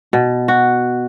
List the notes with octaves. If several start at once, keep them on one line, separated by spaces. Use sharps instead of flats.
B2
F#4